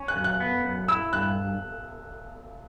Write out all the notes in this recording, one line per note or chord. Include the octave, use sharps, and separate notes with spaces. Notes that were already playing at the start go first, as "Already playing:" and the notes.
Already playing: C#4
F#6
F#2
F#6
B3
F#2
E4 E6
G2 F#6